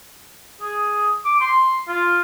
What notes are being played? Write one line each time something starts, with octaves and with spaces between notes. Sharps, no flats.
G#4
D6
C6
F4